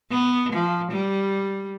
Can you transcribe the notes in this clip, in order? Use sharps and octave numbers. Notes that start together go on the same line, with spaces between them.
B3
F3
G3